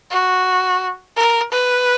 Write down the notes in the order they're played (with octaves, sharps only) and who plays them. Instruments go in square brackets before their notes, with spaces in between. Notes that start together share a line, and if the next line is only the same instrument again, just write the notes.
[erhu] F#4
A#4
B4